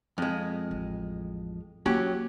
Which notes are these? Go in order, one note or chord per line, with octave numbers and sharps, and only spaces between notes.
F2 G#3
A1
F#3 A#3 C#4 G4